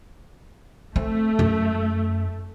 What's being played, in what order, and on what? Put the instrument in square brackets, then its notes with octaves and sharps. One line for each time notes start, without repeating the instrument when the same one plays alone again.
[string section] A3 [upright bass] C4
[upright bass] F#2